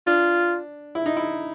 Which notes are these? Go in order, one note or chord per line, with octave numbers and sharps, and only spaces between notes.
D4 F4
E4
D#4
E4